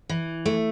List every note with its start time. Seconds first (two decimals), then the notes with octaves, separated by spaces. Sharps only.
0.09 E3
0.46 A3